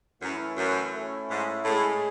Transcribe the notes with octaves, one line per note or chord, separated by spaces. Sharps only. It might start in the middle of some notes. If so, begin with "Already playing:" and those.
F#2 E3 A3 C#4 E4
F#2
A3 C#4 E4
G#2
A2 G#3 C#4 G#4